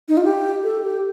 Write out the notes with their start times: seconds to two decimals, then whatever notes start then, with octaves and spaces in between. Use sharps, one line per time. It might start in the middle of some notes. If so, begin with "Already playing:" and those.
0.09 D#4
0.17 F4
0.24 G4
0.64 A4
0.84 G4